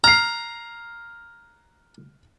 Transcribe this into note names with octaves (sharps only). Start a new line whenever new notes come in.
A#5 F6 C7